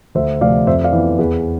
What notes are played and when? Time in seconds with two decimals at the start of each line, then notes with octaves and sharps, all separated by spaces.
0.15 D2 C5 E5
0.41 C3 F3 A3 C4 D5 F5
0.67 F2 C5 E5
0.84 D5 F5
0.92 E3 B3
1.19 E2 G#4 B4